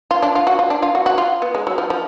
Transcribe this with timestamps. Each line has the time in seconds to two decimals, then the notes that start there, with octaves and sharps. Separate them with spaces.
0.11 F4
0.22 D4
0.35 F4
0.47 F#4
0.59 F4
0.70 D4
0.82 F4
0.95 F#4
1.06 F#4
1.18 F4
1.42 B3
1.55 G#3
1.67 F#3
1.78 F3
1.90 F3